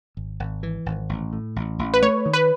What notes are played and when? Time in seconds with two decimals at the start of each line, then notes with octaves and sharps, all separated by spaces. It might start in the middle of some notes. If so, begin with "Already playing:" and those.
0.17 G#1
0.40 G#1
0.63 E3
0.86 G#1
1.09 A1
1.33 A2
1.56 A1
1.79 A1
1.94 B4
2.03 A3 C#5
2.26 D#3
2.33 B4